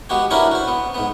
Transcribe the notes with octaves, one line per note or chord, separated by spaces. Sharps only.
G#3 B3 F#4 G4
C#4 D4 E4 F#4 A#4 B4
F#4 C5
B3
G#2 B3